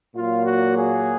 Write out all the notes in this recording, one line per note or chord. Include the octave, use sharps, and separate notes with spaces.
A#2 F#3 A#3 F4
F#4
G#4